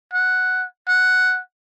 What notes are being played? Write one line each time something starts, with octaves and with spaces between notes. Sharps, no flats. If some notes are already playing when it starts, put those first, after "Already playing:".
F#5
F#5